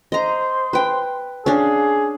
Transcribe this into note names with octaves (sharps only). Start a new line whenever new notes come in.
C5 D#5 A#5 C6
B4 G5
C#4 D4 G#4 F5